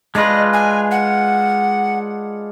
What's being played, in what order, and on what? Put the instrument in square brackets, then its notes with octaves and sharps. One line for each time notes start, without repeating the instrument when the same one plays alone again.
[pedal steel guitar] G#3 D4 F4 B4 [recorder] D#5
[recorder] G#5
F#5